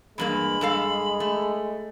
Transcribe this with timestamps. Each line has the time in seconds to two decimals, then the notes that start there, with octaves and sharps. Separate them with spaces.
0.18 E2 G2 G#3 A#3 B5
0.61 G2 A4 F5
1.20 A3